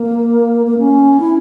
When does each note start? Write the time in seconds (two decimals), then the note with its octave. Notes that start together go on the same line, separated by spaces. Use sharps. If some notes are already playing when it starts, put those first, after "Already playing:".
Already playing: A#3
0.67 A#3
0.79 C#4
1.20 E4